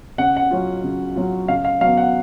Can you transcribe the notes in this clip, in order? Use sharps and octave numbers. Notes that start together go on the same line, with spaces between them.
C#3 F#5
F#5
F#3 C#4 F4
C#3
F#3 C#4 F4
C#3 F5
F5
F#3 B3 F5
F#5